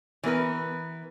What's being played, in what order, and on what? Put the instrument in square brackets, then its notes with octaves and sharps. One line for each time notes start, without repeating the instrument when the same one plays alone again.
[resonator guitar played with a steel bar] E3 B3 A#4 B4